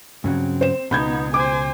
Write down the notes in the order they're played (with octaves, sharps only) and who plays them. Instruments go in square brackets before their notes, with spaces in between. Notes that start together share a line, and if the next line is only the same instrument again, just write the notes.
[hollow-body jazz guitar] G2 C#3 F#3 [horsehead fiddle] C4
[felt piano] C5 E7
[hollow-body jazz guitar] C#2 B2 [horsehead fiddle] B3 D#4 [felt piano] B5 G6 G#6
[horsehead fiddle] C5 G#5 [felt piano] D6